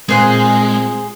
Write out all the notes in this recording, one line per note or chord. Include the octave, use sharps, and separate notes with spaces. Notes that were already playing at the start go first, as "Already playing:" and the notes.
A#2 G#3 C4 G#4 C5 F#6